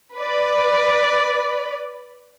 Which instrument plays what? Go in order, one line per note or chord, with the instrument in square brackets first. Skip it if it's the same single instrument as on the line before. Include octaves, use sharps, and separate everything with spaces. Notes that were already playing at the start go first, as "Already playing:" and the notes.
[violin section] B4 D5